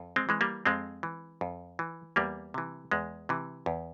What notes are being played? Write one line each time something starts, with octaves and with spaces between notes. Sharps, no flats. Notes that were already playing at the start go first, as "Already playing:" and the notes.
Already playing: F2
G#3 C4
E3 G#3
G3 A#3
F2 G#3 C4
E3
F2
E3
E2 G3 A#3
C3 E3
E2 G#3
C3 E3
E2